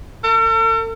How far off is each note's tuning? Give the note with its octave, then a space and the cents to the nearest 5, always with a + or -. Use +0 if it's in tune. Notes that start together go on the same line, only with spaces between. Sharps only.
A4 +45